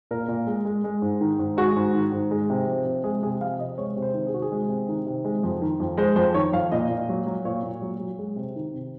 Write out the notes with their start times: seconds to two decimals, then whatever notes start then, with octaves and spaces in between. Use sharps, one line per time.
0.11 A#2 A#4
0.28 A#2
0.47 G#3
0.65 G#3
0.84 G#3
1.02 G#2
1.21 D#3
1.39 G#2
1.57 G#3 F#4
1.76 G#2
1.94 D#3
2.12 G#2
2.31 G#3
2.50 C3
2.68 F3
2.86 C3
3.04 G#3 G#4
3.23 C3 G#4
3.41 F3 F5
3.59 C3 D#5
3.78 G#3 C#5
3.96 C3
4.02 C5
4.14 D#3
4.27 G#4
4.33 C3 F#4
4.42 G#4
4.52 G#3
4.69 C3
4.88 D#3
5.06 C3
5.25 G#3
5.43 F2
5.62 D#3
5.80 F2
5.97 G#3 C5
6.16 F2 C5
6.34 D#3 C#5
6.52 F2 F5
6.72 A#2 D#5
6.90 A#2
7.09 F#3
7.26 F#3
7.45 A#2 C#5
7.63 A#2
7.82 F#3
8.00 F#3
8.18 G#3
8.36 C3
8.56 D#3
8.74 C3